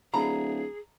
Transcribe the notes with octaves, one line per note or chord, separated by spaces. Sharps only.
D1 G#4 A#5